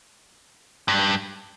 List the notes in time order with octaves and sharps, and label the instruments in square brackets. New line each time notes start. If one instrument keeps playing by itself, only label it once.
[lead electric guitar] G2